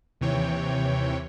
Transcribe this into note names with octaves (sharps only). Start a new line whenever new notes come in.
D#2 C3 E3 C#5 G5